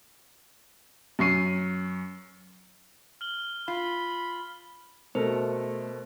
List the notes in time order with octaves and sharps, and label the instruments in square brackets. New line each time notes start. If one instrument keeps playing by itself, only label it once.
[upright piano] F#2 C#6 C7 D#7
[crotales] F6 F#7 G7
[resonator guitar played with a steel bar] F4 [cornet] B5
[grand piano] B2 [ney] A3 [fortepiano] A4 A#4 [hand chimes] C5